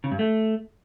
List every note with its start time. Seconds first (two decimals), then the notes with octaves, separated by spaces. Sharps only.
0.04 C#3
0.11 G2
0.19 A3